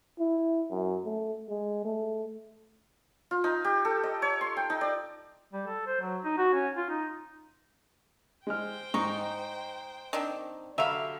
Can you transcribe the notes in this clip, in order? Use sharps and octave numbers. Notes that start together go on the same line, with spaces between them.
E4
F#2
A3
G#3
A3
F4
D#4
G4
A4
D#5
C#5
C6
G5
D#4
D5
G3
A4
C5
F#3
D#4
F#4
C#4
F4
D#4
G#3 C5 G5 F6
G#2 D#4 A#5 C#6
D#3 C4 D4
D3 F#3 G4 E5 F5 B5